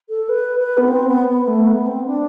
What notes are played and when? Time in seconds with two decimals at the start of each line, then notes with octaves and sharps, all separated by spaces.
0.09 A4
0.29 B4
0.59 B4
0.77 B3
0.87 C4
1.07 B3
1.27 B3
1.47 A3
1.66 B3
1.86 C4
2.06 D4